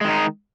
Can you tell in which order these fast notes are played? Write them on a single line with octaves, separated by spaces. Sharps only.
G#3 D#3 D#4